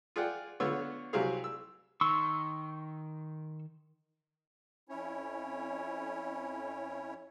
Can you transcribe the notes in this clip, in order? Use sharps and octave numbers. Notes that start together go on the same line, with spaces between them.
F4 G#4 D5 F#5 G5
D3 B3 F4 C#5 E6
C2 C3 F#3 C4 G#4 F5
E6
D#3 C6 C#6 E6
F2 C#4 E4 C#5